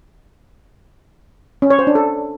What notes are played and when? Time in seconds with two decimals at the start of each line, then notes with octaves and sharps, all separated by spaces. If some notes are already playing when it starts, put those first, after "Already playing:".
1.62 C#4
1.70 C#5
1.79 C5
1.87 D4
1.95 A4